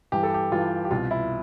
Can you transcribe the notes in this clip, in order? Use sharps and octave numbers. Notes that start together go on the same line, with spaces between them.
G2 E3 G4
A4
G4
G2 E3 F4
G4
C2 B2 F4
E4